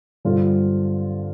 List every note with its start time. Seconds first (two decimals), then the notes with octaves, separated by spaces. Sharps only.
0.25 G2 D3 G3 C4 F4